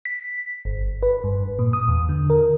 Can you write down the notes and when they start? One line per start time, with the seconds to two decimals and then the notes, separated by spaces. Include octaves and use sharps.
0.05 B6
0.65 G1
1.03 B4
1.24 G2
1.59 A#2
1.73 D#6
1.88 E2
2.09 D3
2.30 A#4